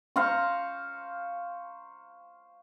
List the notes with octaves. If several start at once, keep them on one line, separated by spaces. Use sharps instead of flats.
C5 F5 A#5 C#6